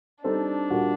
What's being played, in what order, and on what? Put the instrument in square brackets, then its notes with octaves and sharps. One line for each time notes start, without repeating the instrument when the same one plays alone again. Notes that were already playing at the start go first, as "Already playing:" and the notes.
[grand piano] G3 C4 D#4 A4 [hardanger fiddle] D4
[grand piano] A#2 G3 A#3 F#4 A#4